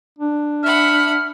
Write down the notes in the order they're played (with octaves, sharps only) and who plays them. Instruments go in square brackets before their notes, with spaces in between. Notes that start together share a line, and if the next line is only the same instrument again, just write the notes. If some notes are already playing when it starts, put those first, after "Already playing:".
[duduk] D4
[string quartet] E5 F#5 B5 [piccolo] F6